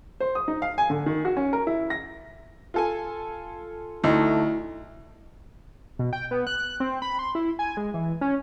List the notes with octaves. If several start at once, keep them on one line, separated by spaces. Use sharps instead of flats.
C5
D#6
D#4
F5
G#5
D3
D#3
F#4
C#4
A#4
E4
A#6
F4 A4 G#5
D2 A3 D#4 E4 D#5
B2
G5
B3
F#6
C4
B5
C6
E4
G#5
G#3
E3
C#4